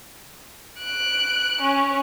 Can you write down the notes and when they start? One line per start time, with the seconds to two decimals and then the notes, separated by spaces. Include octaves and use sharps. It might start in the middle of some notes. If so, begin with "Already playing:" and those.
0.79 F#6 D7
1.62 C#4